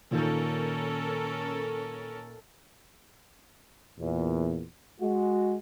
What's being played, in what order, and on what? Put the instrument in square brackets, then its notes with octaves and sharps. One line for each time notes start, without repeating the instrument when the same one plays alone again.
[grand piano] A#2 D#3 G6 [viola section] C#4 A4 A#4
[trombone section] E2 A#2
G#3 F#4